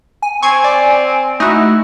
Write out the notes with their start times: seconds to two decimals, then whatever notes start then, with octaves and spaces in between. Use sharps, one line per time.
0.22 G#5
0.42 C4 G#5 C#6 G#6 C7
0.64 D5
1.40 A3 D#4 E4 F#4